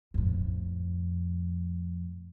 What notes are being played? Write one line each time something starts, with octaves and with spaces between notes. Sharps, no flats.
F2 A2